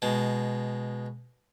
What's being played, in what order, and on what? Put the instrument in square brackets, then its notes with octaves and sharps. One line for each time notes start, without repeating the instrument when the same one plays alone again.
[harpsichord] B2 G#3